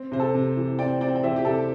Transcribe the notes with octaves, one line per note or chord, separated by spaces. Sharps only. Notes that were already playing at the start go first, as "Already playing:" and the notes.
Already playing: C4
C3 C5
A4
C3
E3
C4 D5 G5
C4 D5 G5
G5
E3 C5 E5
G4
C3 A4